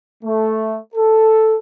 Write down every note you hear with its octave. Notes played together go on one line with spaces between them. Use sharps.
A3
A4